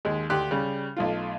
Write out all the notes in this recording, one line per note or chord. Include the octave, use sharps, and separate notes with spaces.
D#2 G#3
D2 G4 C6 F#6
C#3 G3
B1 A3 F4